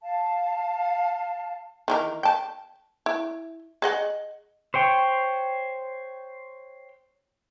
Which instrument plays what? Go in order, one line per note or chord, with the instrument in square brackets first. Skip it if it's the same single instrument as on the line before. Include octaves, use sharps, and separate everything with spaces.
[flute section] F5 A5
[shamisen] D#3 E3 A#4
G5 A5
E4
G#4 D#5 F#5
[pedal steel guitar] C5 C#5 G5